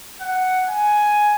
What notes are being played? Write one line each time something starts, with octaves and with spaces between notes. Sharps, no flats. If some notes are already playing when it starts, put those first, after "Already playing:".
F#5
G#5